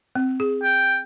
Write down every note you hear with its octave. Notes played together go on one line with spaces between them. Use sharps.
C4
G#4
G5